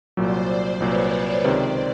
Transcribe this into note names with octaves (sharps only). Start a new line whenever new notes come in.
C2 A#2 F#3 C5 D5
C2 A#2 F#3 B4 C#5
C#2 C3 D#3 C5 D5